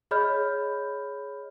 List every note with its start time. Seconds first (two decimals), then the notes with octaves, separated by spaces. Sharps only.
0.11 G#4 C#5 D#5 B5 F6 G6